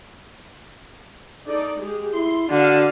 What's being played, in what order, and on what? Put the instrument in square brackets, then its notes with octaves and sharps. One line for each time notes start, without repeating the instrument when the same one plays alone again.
[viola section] D#4 A4 D5
G#3 G4 G#4
[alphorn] E4 [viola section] C6
[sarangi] D3 [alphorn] F#4 [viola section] D5 F5